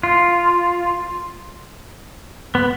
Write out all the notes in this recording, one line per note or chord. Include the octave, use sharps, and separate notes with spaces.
F4
B3